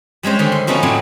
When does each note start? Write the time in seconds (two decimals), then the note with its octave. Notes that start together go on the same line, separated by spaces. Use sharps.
0.23 G3 G#3 C#4 C5
0.39 D3 D#3 G3
0.52 C6
0.67 F3 A3 B3 C#4 D#4 F#4
0.83 A2 F#3 C4 D4 F#4